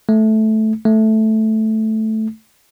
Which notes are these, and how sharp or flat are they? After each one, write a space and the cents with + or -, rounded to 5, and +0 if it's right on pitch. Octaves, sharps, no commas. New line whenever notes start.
A3 -10
A3 -5